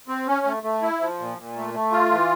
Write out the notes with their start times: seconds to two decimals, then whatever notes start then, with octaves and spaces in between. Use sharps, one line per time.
0.08 C4
0.27 C#4
0.46 A3
0.63 A3
0.82 E4
1.00 F3
1.19 A#2
1.38 A#2
1.56 A3
1.74 A3
1.92 F4
2.11 E3